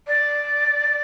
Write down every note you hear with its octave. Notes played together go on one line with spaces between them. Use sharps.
D5